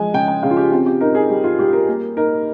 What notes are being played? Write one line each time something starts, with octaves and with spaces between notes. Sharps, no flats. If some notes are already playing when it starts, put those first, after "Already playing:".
Already playing: F3 G#3 G#5
C#3 G5
G5
C#3 F5
F4
G4
C4 F4
G4
D#4 A#4
G#4
G3
F4
G3 G4
A#4
A#3
D#4 A#4